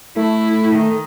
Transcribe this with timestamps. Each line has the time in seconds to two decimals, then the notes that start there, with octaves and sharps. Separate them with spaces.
0.16 A3 E4
0.75 D#3